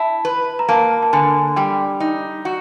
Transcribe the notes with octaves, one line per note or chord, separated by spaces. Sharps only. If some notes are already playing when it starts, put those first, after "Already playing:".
Already playing: E4 A5
B4
A#5
A#3 A5
A5
D3 G#5
G3 G5
D#4
F#4